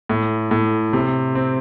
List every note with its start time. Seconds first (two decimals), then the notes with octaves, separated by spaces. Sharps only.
0.09 A2
0.51 A2
0.93 C3
1.35 C4